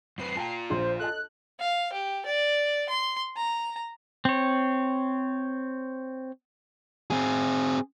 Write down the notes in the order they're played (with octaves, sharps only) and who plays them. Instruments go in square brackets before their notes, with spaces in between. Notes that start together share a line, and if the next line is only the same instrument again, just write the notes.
[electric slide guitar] F#2 C4 B4 [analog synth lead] C7
[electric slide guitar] F4 A#5 [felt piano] G5 A5
[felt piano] A#1 [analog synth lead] C5
[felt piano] A4 D#5 A5 [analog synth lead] F#6
[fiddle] F5
G4
D5
C6
A#5
[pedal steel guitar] C4 C#5
[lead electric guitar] C4 G#4